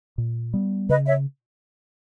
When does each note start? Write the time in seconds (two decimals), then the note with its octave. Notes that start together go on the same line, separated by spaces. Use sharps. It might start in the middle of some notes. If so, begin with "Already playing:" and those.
0.18 A#2
0.54 G3 B3
0.89 C#3 B4 D#5
1.06 C#5 E5